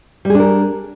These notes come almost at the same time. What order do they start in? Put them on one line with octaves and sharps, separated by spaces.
G3 G#4 D4 A#4